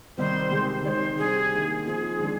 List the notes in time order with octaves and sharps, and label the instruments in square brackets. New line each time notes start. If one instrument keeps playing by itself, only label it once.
[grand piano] C3 D#3 G3 C4 D#4 [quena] C5
[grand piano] C3 D#3 G#3
[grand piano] D#3 G#3 C4 D#4 [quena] C5 D5
[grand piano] C3 G3 D4 [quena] G#4
[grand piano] D#3 A#3 D#4
[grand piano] F3 C4 D#4 [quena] G#4
[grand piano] D#3 G#3 D4